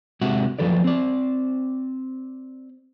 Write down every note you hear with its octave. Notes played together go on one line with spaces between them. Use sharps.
C3 G#3 F#4 E5 F#5
F3 F#3 A4 B4 D5
C4 C5 D5